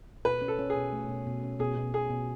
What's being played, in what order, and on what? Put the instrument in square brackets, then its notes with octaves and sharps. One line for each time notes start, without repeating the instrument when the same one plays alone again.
[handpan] B2 [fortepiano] B4
[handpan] C#4
[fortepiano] A4
[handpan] C#4
[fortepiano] G#4
[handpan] B2
A3
B2
B2
C#4
[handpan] B2 [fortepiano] G#4
[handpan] B2
[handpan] B2 [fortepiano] G#4
[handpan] B2